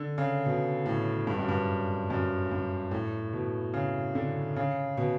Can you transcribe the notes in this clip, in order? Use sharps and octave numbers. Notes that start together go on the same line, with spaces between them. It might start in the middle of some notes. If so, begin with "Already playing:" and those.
Already playing: D3
C#3
B2
A2
G2
F#2
G2
F#2
G2
A2
B2
C#3
D3
C#3
B2